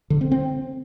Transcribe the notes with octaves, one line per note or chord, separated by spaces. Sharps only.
D3
C4
C4